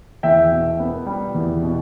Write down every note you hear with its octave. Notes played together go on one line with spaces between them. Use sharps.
E2 E5 G5
B2
B3
G3
E2
B2